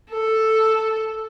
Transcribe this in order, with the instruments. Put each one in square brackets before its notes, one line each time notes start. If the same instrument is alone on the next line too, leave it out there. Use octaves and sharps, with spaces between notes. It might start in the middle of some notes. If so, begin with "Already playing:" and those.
[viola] A4